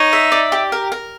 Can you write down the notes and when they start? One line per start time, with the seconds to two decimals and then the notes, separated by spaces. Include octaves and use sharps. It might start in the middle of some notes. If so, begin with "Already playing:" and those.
Already playing: D#4 C#5
0.13 E5
0.32 D5
0.52 G4
0.72 A#4
0.92 A#4